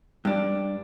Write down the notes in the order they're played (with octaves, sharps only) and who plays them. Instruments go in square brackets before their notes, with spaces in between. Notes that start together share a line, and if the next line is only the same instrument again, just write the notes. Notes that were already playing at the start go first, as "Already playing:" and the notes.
[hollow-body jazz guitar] G2 D4